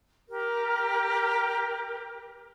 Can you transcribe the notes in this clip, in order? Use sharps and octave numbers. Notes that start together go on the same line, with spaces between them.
G4 A#4